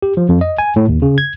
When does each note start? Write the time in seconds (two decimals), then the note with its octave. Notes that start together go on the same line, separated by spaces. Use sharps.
0.02 G4
0.17 F3
0.29 F2
0.41 D#5
0.58 G#5
0.76 A2
0.89 D#2
1.02 C#3
1.18 G#6